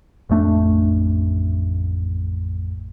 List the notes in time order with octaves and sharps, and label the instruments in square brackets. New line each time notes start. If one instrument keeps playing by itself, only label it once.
[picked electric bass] A1 F2 A3 D4